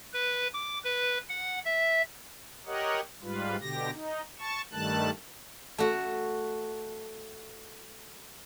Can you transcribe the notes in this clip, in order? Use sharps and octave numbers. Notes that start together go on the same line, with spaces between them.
B4
D6
B4
F#5
E5
G4 A#4 C#5 D#5 F#5
G#2 G3 F4 B4
B2 D3 G4 A#6
D#4
A5 C#6
G2 D#3 G3 A3 A5 F#6
A3 F#4